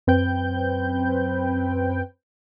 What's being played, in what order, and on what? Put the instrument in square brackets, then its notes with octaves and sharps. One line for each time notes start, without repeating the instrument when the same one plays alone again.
[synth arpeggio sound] F#2 C4 B4 G5 G6